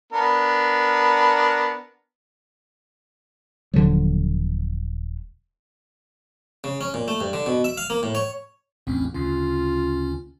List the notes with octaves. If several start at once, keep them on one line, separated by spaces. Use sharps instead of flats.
B3 D4 A#4
D#1 D3 F3 F#3
C#3
C#4
A#2
A3
G2
D3
B2
E5
F5
A#3
A2
C#5
A1 E2 C4 C#4
D2 C#3 C#4 F4